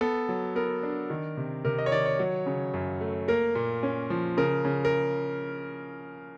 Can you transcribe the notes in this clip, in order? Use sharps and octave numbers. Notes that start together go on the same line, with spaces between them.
B3 A4
F#3
B3 A#4
D4
D#3
C3
C3 A#4
D#5
C#5
D#3 D5
C#5
F#3
C#3
F#2
A3
A#3 A#4
A#2
C#4
F3
C#3 A#4
C#3
A#4